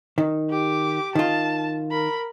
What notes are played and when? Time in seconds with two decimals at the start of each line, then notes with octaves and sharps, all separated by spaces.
0.18 D#3
0.50 G4 D6
1.15 D#3 F4 A5
1.91 A#4 B5